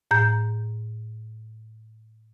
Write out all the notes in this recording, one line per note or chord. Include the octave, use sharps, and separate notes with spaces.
A2 A#5 G6